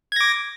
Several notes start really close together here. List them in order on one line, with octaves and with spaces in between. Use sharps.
G#6 A#6 D6